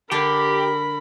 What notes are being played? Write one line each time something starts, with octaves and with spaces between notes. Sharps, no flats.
D3 D4 G4 A#4 B5